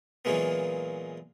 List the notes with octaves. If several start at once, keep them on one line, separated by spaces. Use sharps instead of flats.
A#2 E3 F#3 G#3 A#3 B3